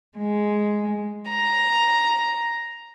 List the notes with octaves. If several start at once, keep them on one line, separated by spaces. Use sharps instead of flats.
G#3
A#5